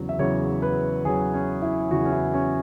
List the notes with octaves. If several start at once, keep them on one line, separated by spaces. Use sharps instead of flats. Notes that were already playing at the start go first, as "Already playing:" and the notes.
Already playing: E2 C#3 F#3
E5
E2 C#3 F#3 C#5
B4
E2 C#3 F#3 G#4
C#4
E4
E2 C#3 F#3 F#4
C#4
E4
C#4